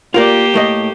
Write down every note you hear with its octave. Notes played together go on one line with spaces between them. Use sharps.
A#3 F4 G4 A#4 D5
A2 A3 D#5